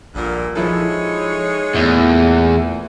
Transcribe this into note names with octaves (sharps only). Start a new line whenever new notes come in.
A#1 G2 A#2 D3 A#4
F3 G#3 D#4 E4 A4 C#5
E2 A#2 E3 A3